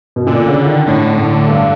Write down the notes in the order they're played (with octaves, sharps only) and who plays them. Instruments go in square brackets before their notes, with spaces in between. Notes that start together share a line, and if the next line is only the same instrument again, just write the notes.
[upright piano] B2
[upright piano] A#2 [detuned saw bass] D3
[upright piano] C#3
D#3
[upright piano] A2 [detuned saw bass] D3
[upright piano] A2
G2